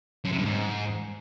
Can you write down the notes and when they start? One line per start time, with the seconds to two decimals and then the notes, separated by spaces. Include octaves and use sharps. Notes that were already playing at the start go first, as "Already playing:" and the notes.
0.25 F#2
0.31 C3
0.38 G2
0.45 G#2